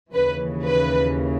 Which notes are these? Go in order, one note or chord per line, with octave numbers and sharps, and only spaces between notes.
D#2 C#3 E3 B4
B4